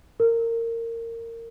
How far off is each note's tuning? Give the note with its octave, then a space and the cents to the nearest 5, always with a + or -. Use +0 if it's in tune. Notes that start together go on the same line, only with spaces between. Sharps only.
A#4 -20